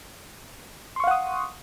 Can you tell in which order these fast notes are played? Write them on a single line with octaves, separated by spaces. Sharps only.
C6 C#6 F5 F#5 D#6